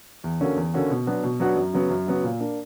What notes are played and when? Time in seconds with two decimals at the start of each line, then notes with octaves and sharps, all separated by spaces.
0.24 E2
0.41 D3 A#3 C#4 F#4
0.56 E2
0.74 D3 A#3 C#4 F#4
0.90 B2
1.07 F#3 B3 D4 F#4
1.24 B2
1.40 F#3 B3 D4 F#4
1.56 F#2
1.73 C#3 F#3 B3
1.90 F#2
2.07 C#3 F#3 B3
2.24 A#2
2.40 A#3 D4